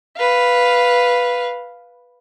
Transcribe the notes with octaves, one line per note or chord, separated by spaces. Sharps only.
B4 F5